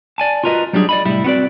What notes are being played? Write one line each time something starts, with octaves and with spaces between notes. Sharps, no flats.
D5 G#5 A5
F4 F#4 A#4 B4 D#5
F#3 G3 D4 F4 G#4
D5 D#5 B5
C2 A2 G3 E4
B3 C4 F#4 B4 D5